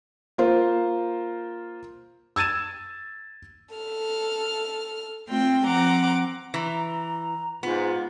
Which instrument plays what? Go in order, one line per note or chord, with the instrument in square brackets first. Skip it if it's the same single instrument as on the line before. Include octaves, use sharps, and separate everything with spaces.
[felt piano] A#3 F4 C5
E6 G#6 A6 D#7 E7
[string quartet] A4 F6
A3 C4 F4 G5
F3 C4 F#5 A#5 D6
[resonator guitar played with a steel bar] E3 [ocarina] A#5
[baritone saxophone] G#2 [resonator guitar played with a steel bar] B3 [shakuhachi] F4